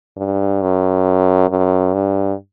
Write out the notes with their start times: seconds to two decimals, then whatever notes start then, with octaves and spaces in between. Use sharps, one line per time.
0.17 G2
0.62 F#2
1.49 F#2
1.93 G2